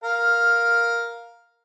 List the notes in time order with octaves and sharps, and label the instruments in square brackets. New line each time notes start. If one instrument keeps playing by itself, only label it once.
[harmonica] A#4 F5